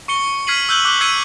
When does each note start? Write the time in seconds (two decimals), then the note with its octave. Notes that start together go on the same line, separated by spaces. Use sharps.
0.08 C#6 C#7 G7
0.47 F6 G#6 B6 C7 D#7 F#7
0.69 E6 F#6 G6 F#7 G7
0.85 D6 F#6 F#7 G7
1.01 E6 G#6 B6 C#7 D#7